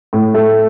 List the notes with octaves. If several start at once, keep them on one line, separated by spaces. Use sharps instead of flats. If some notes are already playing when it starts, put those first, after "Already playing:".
A2
A3